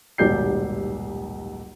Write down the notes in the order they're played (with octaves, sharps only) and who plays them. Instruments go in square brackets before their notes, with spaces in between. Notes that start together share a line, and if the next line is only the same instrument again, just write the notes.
[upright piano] D#1 B1 G#2 G4 G6 C7